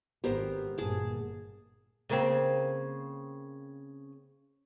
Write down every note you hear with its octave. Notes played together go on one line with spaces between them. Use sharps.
G#1 B3 G4 A#4 C5
G1 A#2 A#3 G#4 A5
C#3 A#3 C4